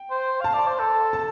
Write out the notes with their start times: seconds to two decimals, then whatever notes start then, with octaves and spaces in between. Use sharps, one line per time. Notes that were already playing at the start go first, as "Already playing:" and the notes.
Already playing: G5
0.10 C5
0.41 F5 A5
0.54 D5
0.67 C5
0.79 A4
1.13 A5